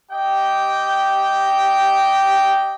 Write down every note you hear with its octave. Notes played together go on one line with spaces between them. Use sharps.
G4 D#5 G5